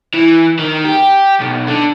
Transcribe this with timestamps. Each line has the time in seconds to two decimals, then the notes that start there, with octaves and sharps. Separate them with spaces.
0.14 E3
0.59 D#3
0.85 G4
1.41 B1
1.68 D3